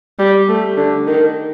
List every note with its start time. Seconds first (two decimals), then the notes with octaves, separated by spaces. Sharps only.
0.19 G3
0.48 A3
0.77 D3
1.07 D#3